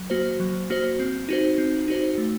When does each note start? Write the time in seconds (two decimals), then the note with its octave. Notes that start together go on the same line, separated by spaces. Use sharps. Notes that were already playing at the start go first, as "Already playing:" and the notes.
Already playing: F#3
0.10 A#3 F#4 C5
0.40 F#3
0.70 A#3 F#4 C5
1.00 C4
1.29 D#4 F#4 C5
1.58 C4
1.88 D#4 F#4 C5
2.18 A3